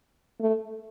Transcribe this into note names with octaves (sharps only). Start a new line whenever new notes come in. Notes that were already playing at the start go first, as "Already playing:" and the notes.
A3